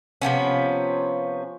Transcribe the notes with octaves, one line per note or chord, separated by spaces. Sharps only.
C3 F3 B3 C#4